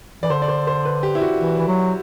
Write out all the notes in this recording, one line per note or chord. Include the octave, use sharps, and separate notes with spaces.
E3 D5
D3 C5
D5
C5
C5
B4
G4
E4
F#4
E3
E3
F#3